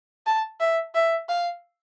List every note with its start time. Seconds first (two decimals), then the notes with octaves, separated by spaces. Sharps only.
0.27 A5
0.60 E5
0.95 E5
1.29 F5